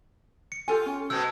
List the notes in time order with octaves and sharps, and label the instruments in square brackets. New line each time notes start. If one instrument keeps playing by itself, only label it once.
[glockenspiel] C#7
[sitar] F4 [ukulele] G4 A4 G#5
[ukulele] C#4
[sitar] B2 G#3 C4 [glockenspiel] E6